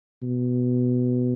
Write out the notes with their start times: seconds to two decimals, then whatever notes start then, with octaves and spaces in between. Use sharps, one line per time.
0.22 B2